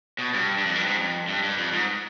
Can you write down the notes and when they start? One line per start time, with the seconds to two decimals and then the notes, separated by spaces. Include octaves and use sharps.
0.19 B2
0.34 G2
0.58 G2
0.66 F2
0.75 G2
0.86 G#2
0.97 F2
1.28 G2
1.43 G2
1.58 F2
1.73 G#2